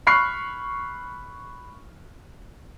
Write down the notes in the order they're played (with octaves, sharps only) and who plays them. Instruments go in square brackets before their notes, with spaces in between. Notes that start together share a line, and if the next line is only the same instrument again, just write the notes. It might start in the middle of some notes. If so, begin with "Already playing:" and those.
[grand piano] B5 C#6 F6 F#6 C7